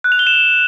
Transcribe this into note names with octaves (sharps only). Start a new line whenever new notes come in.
F#6
F7
G7
E7